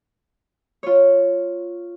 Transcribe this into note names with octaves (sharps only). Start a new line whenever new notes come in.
F4 C#5